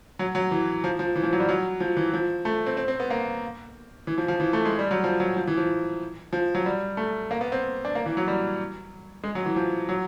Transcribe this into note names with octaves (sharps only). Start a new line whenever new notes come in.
F#3
F#3
E3
F3
F3
E3
F3
F#3
G3
F#3
F3
E3
F3
A3
C4
C4
C4
B3
A#3
E3
F3
F3
E3
A3
G#3
G3
F#3
F3
F#3
F3
E3
F3
F3
F#3
G3
A3
A#3
B3
C4
D4
A#3
E3
F#3
G3
G#3
F#3
E3
F3
F#3